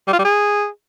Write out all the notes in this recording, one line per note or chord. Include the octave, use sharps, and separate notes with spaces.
G3
F4
G3
G#4